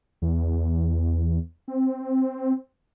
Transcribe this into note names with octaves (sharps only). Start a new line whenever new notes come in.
E2
C4